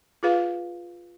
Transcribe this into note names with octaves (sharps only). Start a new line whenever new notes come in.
F4 G#4 B4 F5